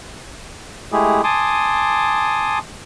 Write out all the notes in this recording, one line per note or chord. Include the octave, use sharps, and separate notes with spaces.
G#3 A3 E4 G4 G#4
G#5 A5 C6 D6 D#6